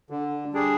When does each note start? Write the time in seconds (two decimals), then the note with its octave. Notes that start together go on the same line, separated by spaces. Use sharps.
0.10 D3
0.53 G3 D4 G#4